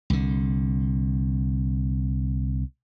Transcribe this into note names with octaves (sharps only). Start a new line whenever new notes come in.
C2 D3